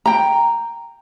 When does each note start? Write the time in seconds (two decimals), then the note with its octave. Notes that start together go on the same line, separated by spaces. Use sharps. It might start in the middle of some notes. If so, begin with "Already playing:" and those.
0.06 G5 A#5